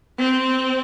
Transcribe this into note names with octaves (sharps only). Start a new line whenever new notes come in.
C4